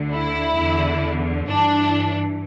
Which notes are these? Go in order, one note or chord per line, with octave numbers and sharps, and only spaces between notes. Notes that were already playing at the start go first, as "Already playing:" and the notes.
Already playing: D2 D3
E4
E2 D3
G2 E3 D4